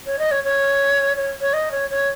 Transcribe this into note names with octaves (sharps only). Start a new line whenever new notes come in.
C#5
D#5
C#5
C#5
C#5
C#5
D#5
C#5
C#5